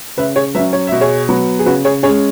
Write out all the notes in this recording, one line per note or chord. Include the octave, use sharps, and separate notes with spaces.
C#3 B4 E5
G#4 C#5
F#3 C#4 B4 E5
C#5
B2 E5
G#4 C#5
F#3 B3
G#4
C#3 F#4 B4
G#4 C#5
G#3 C#4 G#4 C#5